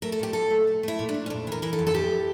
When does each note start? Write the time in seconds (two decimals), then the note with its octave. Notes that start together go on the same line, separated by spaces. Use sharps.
0.02 A3 A#4
0.12 A4
0.19 A#2 G4
0.33 A#2 A4
0.50 A3
0.67 A3
0.83 A3 E4
0.99 A#2
1.09 D4
1.14 A3
1.26 C#4
1.30 F2 D4
1.47 E3 A#4
1.62 E3 A#4
1.73 A4
1.79 F2
1.87 A4
1.94 E3 G4